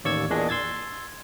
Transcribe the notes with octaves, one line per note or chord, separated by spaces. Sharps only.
A1 D#2 D5 C#6 E6 G#6
E2 A#2 D4 G#4 D#5
C6 E6 G#6 A6